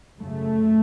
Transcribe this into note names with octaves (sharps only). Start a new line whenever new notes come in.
F#2 C#3 A3